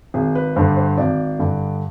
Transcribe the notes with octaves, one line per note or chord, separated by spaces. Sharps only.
G#1 G#4
B4
G2 D3 C5
C5
G#1 D5
G2 D3